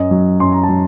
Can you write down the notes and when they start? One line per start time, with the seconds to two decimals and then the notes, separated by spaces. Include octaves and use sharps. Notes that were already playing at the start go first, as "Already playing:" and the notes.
Already playing: F#2 D#5
0.11 F#3
0.40 F#2 C6
0.52 A#5
0.63 A5
0.69 F#3